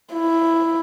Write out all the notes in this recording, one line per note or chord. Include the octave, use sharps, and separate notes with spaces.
E4